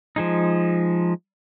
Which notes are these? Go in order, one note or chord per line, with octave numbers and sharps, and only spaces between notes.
F3 G#3 D#4